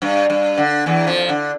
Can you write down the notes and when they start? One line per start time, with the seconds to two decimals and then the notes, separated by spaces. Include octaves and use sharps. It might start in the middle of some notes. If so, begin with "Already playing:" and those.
0.02 G2
0.30 G2
0.58 D3
0.86 E2 E3
1.07 F2 F3
1.29 D3